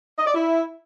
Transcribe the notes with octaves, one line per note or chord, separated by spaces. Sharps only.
D#5
D5
E4